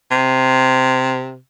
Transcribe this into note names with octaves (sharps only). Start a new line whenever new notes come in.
C3